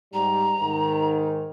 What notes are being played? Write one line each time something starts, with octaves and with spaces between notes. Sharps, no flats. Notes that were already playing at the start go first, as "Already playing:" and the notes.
G#2 G3 A#5
G#2 D#3